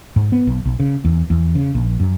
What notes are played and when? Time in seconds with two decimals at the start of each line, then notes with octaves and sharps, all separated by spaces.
0.16 G#2
0.32 B3
0.47 B1
0.65 B1
0.80 C#3
1.05 E2
1.30 E2
1.55 C#3
1.75 A#1
2.00 F#2